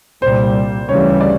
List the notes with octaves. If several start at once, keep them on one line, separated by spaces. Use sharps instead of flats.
C2 A#2 G3 C5
D2 C#3 E3 G3 C#5
D5